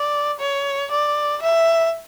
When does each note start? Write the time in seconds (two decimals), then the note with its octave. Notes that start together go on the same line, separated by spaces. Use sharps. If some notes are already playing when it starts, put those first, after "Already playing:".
Already playing: D5
0.40 C#5
0.91 D5
1.42 E5